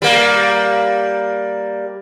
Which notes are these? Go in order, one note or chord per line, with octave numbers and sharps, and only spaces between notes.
G3 A#3